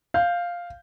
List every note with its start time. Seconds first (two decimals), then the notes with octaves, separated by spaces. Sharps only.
0.14 F5 G6